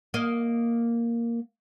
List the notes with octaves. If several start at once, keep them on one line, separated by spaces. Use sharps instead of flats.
A#3 D#5